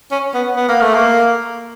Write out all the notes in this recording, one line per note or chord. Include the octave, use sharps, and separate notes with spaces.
C#4
B3
B3
A#3
A3
A#3